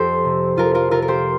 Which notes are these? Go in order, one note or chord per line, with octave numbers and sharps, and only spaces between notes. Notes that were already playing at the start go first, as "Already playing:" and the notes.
Already playing: F2 G4 C5
C3
F2 F4 A#4
F4 A#4
C3 F4 A#4
A#4
G4 C5